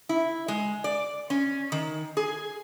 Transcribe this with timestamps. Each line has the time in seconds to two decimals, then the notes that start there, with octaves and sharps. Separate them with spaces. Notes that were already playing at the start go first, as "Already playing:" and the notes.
0.09 E4
0.48 G#3
0.84 D5
1.30 C#4
1.72 D#3
2.17 G#4